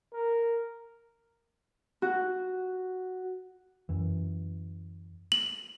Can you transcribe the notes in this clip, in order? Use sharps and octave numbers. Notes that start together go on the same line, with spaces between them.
A#4
F#4
F#2 E3
F#7